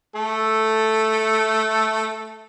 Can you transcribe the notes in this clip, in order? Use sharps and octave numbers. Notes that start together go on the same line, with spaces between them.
A3 A4